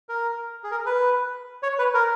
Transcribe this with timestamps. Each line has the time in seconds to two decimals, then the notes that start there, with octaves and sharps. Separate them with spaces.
0.09 A#4
0.64 G#4
0.71 A#4
0.86 B4
1.63 C#5
1.79 B4
1.94 A#4